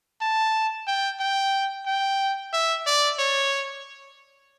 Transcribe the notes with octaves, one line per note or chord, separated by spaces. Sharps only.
A5
G5
G5
G5
E5
D5
C#5